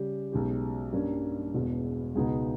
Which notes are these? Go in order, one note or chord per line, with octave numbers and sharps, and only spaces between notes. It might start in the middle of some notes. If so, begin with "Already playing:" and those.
Already playing: C#3 G3 C#4 G4
B1 B2 G#3 C#4 G4
G2 G3 A#3 C#4
E1 E2 B2
C#2 B2 G#3 B3 D#4